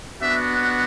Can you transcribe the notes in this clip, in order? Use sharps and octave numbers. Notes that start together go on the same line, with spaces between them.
B3 D4 F#4 E5